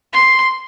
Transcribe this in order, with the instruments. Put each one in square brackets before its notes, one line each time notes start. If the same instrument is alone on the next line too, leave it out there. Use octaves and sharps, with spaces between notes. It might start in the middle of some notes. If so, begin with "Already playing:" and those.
[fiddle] C6